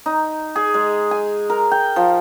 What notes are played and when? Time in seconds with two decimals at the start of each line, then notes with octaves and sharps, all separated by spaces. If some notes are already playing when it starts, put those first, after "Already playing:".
0.06 D#4
0.56 G#4
0.74 G#3
1.11 G#5
1.50 A#4
1.71 G5
1.96 F3